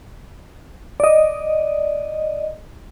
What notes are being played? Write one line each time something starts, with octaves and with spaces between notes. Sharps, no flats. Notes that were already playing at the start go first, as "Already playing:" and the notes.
D5 D#5